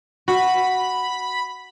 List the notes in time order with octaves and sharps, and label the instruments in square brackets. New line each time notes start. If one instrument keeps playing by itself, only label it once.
[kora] F#4 [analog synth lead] B5